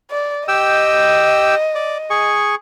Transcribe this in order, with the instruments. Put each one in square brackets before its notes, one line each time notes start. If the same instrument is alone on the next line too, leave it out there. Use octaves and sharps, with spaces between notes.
[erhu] D5
[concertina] G4 G5 E6 [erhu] D#5
[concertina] D5
G#4 C#6